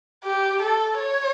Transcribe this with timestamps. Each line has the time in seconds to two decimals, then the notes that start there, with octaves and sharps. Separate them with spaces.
0.24 G4
0.62 A4
0.99 C#5